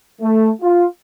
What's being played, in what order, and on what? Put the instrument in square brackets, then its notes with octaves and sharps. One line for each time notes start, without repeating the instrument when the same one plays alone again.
[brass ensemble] A3
F4